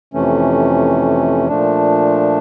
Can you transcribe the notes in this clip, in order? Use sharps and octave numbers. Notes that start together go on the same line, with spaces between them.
F2 C3 E3 A3 C#4
A#2 F3 A3 D4